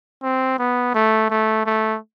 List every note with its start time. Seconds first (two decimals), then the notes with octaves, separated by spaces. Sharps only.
0.23 C4
0.59 B3
0.94 A3
1.30 A3
1.66 A3